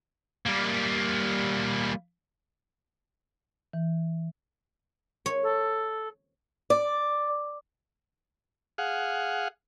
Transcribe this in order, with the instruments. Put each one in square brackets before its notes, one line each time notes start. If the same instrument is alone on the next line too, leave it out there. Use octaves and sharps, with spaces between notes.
[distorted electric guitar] G3 A#3
[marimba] E3
[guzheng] C#5
[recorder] A4
[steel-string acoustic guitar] D5
[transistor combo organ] G#4 F5 F#5